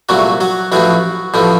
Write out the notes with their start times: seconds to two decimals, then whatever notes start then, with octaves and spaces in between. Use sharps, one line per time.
0.09 C2 A#2 F#3 A3 F#4
0.40 F#3 F#4
0.72 A1 A2 F3 F#3 A3 F#4
1.34 A1 A2 F3 A3